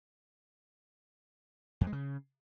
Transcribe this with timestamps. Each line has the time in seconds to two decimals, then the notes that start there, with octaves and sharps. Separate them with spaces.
1.81 F2
1.87 G#3
1.92 C#3